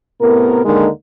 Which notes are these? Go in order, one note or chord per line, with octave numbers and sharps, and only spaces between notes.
A2 C3 B3 A#4
D#2 D3 D#3 G#3 A#3 D#4